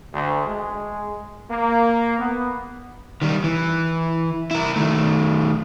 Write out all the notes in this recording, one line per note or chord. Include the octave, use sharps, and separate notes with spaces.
D2
G#3
A#3
B3
D#3 G3
E3
E4 A#4
D#3 A3